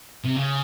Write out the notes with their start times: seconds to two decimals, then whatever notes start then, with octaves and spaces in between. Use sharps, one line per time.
0.24 C3
0.36 C#3